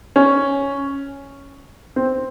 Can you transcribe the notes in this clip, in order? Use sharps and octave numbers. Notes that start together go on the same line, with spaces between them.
C#4
C4